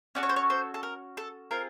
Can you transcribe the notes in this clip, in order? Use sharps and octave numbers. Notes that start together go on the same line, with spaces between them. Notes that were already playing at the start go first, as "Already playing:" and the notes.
C#4 F#4 A4 D5
C#5
C5
C#5
C5
A4
A#4
A4
C4 F4 G#4 A#4